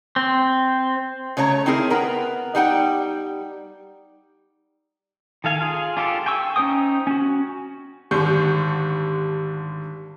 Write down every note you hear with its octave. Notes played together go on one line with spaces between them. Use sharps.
C4
C#3 A3 C#5 A#5
C4 D#4 E4 G#4 A#4
B3 A#4 A#5
G3 D#4 F#5 G5
D#3 A4 F5 G#5
F4 G#4
D4 F4 G4 A4
G5 G#5 C#6 E6
C#4 D#4 C5 G5 D#6
C#4 F#4
G#1 D3 G3 C#6 G6